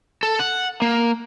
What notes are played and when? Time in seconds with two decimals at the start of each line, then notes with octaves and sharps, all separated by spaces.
0.23 A4
0.40 F#5
0.82 A#3